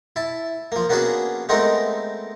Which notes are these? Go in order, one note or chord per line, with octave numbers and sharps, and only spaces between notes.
E4 A5
F3 A#3
A#3 B3 C#4 D4 F#4 G#4
G#3 A3 B3 C4 D#4 A#4